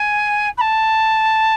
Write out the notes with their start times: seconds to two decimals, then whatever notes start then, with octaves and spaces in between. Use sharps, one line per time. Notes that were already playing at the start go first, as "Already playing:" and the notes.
Already playing: G#5
0.58 B5
0.61 A5